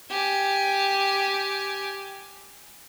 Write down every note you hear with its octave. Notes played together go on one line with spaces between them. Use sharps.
G4 G#5